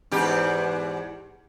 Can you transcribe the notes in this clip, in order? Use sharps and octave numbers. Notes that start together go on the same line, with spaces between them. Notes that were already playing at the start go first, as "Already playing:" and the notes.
E2 G#2 G4